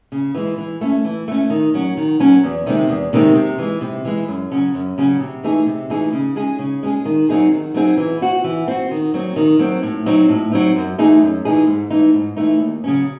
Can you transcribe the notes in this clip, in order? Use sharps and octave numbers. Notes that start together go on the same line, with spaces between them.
C#3
E3 G#3
E3
A3 C#4
E3
A3 C#4
D#3
F#3 C#4
D#3
F#3 C#4
E2
C3 D#3 G#3 C4
E2
C3 D#3 G#3 C4
C3
E3 G#3
C3
E3 G#3
F#2
C#3 F#3 C#4
F#2
C#3 F#3 C#4
C3
E3 A3 D#4 G#4
C3
E3 A3 D#4 G#4
C#3
G#3 C#4 G#4
C#3
G#3 C#4 G#4
D#3
F#3 C4 D#4 G#4
D#3
F#3 C4 D#4 G#4
E3
C4 F#4
E3
C4 F#4
D#3
F#3 C4
D#3
F#3 C4
A2
F#3 C4 D#4
A2
F#3 C4 D#4
F#2
E3 A3 D#4 G#4
F#2
E3 A3 D#4 G#4
G#2
E3 A3 D#4
G#2
E3 A3 D#4
D#2
C#3 F#3 C#4